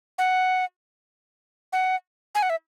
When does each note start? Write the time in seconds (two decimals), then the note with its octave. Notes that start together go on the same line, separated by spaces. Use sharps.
0.18 F#5
1.73 F#5
2.35 G#5
2.43 F#5
2.50 E5